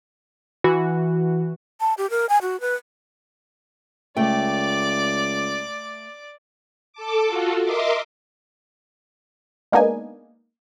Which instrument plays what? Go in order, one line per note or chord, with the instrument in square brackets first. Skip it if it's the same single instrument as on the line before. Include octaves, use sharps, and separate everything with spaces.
[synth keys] E3 F#4
[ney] A5
G4
A#4
G#5
F#4
B4
[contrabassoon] C#2 [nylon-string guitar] A3 G5 [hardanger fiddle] D5 D6
[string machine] A4 A5 D6
F4 F#4 A4
A#4 D#5 E5 C6 D6
[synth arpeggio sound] G#3 A#3 B3 D4 D#4 G#5